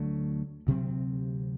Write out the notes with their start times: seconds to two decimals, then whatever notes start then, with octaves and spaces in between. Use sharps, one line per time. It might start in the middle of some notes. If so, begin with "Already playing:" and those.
Already playing: D2 D3 F#3 A3
0.67 D2 C3 F#3 C4